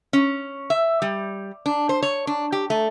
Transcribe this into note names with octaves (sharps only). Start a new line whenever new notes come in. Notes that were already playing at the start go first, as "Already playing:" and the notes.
C#4
E5
G3
D4
C5
C#5
D4
G4
A3